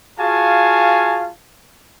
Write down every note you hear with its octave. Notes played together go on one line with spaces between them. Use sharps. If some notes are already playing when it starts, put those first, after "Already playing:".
F4 F#4 G#4 F5 G#5 A5